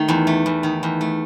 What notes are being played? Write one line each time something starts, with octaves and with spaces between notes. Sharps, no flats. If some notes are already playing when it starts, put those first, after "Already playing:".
Already playing: D#3 A3
E2
A3
E2
D#3
E2
A3